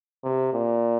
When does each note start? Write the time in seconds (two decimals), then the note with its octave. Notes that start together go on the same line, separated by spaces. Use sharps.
0.24 C3
0.53 A#2